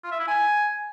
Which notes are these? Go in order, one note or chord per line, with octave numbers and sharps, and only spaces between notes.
F4
E5
E4
G#5